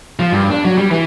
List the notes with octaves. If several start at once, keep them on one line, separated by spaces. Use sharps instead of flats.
F3
G2
D4
F#3
G3
E3